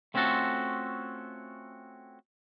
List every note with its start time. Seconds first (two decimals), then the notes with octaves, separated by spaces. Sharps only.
0.14 A3 C4 C#4 F4 F#4 A4